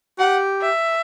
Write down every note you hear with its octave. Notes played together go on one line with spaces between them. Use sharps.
G4 F#5
E5